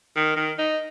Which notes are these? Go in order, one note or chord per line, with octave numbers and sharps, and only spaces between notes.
D#3
D#3
D#4